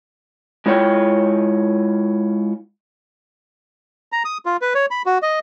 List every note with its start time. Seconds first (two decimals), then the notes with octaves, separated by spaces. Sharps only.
0.66 G#3 E4 F4 C#5 F#5 G5
4.12 A#5
4.25 D#6
4.46 F4
4.62 B4
4.75 C#5
4.91 B5
5.06 F#4
5.22 D#5